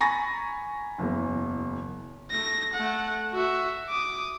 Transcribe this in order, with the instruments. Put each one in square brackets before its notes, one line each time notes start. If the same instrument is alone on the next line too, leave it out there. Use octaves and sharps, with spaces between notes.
[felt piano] G#5 A#5 B5 C#6 A6 A#6
F#1 E2
[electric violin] A3 A#6
A3 F#5
F#4 E5
D6 D#6